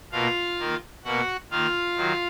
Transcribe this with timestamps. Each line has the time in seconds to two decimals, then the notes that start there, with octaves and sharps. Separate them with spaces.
0.12 B2 A#3 F4 F5
0.59 D#3 A#3
1.04 B2 A#3 F#4 F#5
1.50 D#3 A#3 F4 F5
1.96 D#3 F#3